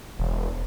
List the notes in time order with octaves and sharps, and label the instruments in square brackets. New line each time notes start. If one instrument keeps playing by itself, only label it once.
[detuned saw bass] E1